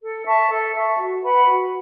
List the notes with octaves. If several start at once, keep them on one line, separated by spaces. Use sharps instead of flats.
A4
E5 A5 C#6
A4
E5 A5 C#6
F#4
B4 F#5 B5
F#4